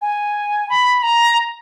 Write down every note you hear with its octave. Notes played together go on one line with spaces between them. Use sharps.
G#5
B5
A#5